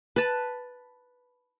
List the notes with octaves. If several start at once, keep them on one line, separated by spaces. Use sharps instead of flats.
B4 A5